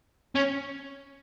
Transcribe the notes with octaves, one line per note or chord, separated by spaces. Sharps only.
C#4